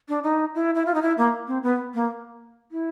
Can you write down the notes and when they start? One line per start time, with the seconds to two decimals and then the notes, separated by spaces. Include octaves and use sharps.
0.09 D4
0.23 D#4
0.55 E4
0.75 E4
0.86 F4
0.94 D#4
1.02 E4
1.18 A#3
1.47 C4
1.63 B3
1.94 A#3
2.72 E4